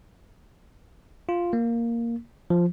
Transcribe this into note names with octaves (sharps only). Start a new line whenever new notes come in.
F4
A#3
F3